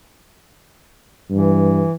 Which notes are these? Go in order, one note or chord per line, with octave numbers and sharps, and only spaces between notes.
G2 E3